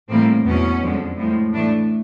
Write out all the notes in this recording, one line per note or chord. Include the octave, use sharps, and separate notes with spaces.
A2 E3 G3 A#3 C4
E2 B2 F#3 C#4
F2 D3 F3 G#3
A2 F3 G#3
A2 E3 A3 D4